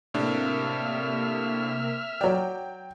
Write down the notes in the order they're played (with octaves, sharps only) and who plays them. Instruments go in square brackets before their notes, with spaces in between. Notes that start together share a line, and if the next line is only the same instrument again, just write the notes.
[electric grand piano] A2 D4 [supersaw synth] C3 A#3 [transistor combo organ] E5 F6
[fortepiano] F#3 D5 [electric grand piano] G5